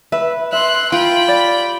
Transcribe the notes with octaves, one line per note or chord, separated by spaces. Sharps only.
B4 E5
E5 C6 F#6
F4 G5 B5
G4 D5